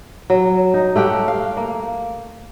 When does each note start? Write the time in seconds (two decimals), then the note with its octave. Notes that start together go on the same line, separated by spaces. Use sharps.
0.30 F#3
0.74 D#4
0.96 A3 G4 F#5 G5
1.28 F5
1.57 A#3